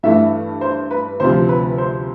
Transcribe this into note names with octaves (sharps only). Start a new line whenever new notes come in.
G2 E3 A3 E5
C5
B4
D2 C3 F3 C5
B4
C5